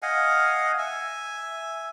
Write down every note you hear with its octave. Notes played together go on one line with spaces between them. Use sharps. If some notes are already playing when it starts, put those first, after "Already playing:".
D#5 F5 F#5 G#5
E5 G#5